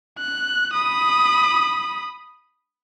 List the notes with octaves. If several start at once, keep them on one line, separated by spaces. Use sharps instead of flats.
F#6
B5 D#6